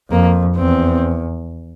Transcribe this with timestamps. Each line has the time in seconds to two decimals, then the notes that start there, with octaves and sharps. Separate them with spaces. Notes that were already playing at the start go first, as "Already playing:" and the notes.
0.10 F2 A#3
0.57 E2 C4